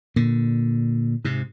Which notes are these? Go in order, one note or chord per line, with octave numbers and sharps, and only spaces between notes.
A#2 D3
G#2 C3